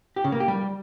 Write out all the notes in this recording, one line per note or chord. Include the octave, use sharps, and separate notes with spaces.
G4
C#3
A#3
G4
G3